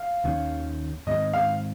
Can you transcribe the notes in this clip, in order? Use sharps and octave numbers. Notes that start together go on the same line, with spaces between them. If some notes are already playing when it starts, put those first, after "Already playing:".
Already playing: F5
D#2 D#3 A#3 C#4
G#2 D#3 G#3 C4 D#5
F5